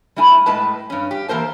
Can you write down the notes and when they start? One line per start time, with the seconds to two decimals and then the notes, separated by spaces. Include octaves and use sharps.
0.16 G3 A3 E4 G#5
0.46 A2 G#3 B4 A5
0.90 G2 C#4
1.11 G4
1.28 E3 A#3 A#4 C5 A5